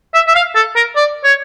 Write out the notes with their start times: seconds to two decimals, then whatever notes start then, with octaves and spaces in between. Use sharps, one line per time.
0.14 E5
0.28 E5
0.35 F5
0.55 A4
0.76 A#4
0.96 D5
1.24 C#5